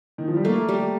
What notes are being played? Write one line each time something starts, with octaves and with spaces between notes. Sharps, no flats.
D#3
F3
G3
A3 A#3
G3